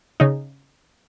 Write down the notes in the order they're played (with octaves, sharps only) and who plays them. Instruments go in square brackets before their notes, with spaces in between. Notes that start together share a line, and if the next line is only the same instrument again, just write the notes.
[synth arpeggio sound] C#3 D#4